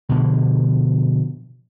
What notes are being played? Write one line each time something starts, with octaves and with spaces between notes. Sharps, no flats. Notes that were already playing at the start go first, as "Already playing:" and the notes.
B2 D3 F3